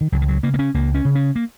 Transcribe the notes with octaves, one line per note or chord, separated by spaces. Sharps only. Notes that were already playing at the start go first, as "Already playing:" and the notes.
D#3
C#2 F#3
D#3
F#3
C#3 A#3
A#3
C#4
C#2 A#3
C#4
C#3
C#4
A#3